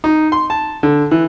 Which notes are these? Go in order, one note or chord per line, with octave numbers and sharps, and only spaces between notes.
D#4
C6
A5
D3
E3